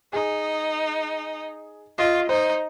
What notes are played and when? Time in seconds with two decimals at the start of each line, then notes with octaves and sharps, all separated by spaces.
0.13 D#4 G#4
1.98 F4 D#5
2.29 D#4 C5